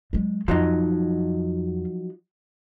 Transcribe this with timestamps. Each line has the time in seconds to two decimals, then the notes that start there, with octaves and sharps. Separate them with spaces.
0.13 F#3 G#3
0.48 F2 F3 F#3 D#4 F4